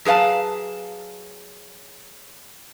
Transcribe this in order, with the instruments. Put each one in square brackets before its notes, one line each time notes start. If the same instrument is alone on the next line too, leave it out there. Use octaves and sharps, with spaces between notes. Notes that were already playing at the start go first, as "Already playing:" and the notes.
[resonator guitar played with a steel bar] F#3 G#4 B4 F5 A5